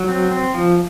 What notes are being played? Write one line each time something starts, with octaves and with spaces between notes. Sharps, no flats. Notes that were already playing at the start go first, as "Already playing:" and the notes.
Already playing: F#3
C4
C4
F3